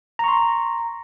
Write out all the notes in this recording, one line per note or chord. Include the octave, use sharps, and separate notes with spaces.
A#5 C6 C#6